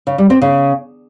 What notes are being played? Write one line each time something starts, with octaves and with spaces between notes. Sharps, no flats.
C#3
G3
C4
C#3